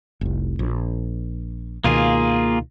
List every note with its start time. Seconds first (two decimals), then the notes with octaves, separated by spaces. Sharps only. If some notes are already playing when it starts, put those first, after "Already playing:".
0.21 F1 C2
0.59 A#1
1.84 C#2 B2 D#3 A#3 F4 G#4